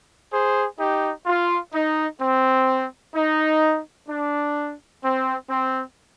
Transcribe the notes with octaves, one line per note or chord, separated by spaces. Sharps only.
G#4 C5
D#4 G4
F4
D#4
C4
D#4
D4
C4
C4